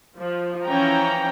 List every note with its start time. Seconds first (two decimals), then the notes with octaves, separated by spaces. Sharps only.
0.17 F3
0.65 E3 F3 C#4 G5 A#5